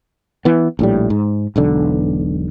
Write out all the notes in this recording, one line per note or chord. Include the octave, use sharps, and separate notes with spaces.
E3 B3
A#1 A2 G3
G#2
E1 B1 D3